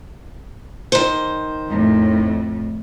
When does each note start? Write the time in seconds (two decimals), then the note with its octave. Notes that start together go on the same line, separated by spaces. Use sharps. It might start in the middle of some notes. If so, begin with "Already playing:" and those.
0.92 D#3 C5
1.68 F2 A2